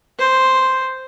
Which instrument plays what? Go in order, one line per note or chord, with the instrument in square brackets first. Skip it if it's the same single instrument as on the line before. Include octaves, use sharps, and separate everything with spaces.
[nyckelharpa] C5